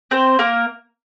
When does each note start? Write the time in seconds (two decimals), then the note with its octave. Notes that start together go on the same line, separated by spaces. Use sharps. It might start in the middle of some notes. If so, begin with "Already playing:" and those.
0.11 C4 C5
0.39 A#3 A#4